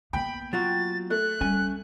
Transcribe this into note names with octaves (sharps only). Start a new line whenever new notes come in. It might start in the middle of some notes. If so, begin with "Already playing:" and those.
A#3 B3 G5 B5
F#3 F4 F#4 A6
A3 F#6
G3 C#4 G#5